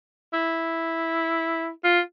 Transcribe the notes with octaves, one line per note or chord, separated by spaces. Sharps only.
E4
F4